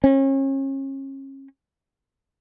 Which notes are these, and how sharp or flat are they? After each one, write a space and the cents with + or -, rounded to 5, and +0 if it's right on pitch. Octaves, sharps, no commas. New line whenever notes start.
C#4 -35